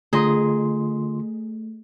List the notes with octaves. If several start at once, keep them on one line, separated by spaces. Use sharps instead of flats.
D3 A3 F4 G#4 D#5 C6